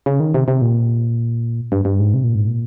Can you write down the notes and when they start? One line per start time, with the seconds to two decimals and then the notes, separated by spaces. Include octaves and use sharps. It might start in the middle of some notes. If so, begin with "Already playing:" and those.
0.06 C#3
0.20 D#3
0.34 C3
0.48 C3
0.62 A#2
1.72 G2
1.85 G2
2.00 G#2
2.14 C3
2.24 A#2
2.35 G#2
2.47 A#2